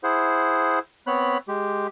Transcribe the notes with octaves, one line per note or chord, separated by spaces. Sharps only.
E4 G#4 C5 F#5
B3 C4 C#5 B5 F#6
G#3 G4